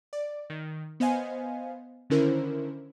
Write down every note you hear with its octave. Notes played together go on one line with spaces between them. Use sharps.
D5
D#3
B3 C5 D#5 F5 G#5
D3 D#3 C#4 E4 A#4 C5